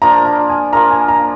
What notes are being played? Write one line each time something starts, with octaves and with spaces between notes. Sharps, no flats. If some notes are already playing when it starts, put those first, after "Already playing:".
F3 A#3 D4 A#5
A#5
G#5
A#3 F4 A#4 A#5
G#5
A#5